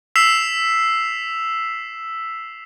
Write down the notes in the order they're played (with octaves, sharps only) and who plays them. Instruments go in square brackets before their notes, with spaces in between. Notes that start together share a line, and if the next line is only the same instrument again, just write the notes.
[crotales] E6 B6 C7 E7 F7